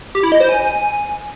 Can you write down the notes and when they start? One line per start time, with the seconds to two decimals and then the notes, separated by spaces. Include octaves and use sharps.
0.15 G4
0.23 E4
0.32 D#5
0.40 C5
0.49 G#5